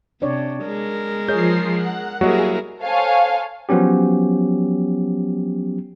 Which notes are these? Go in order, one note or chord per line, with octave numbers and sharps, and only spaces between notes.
C3 D4 C#5 D5
G#3 A#4
F3 G#4 C#5 D#5 G6 C7
F#5
F#3 G3 A#3 E4 F#4 G#4 A#4 D#5
A4 C5 C#5 F5 G#5
F3 F#3 B3 C#4 G4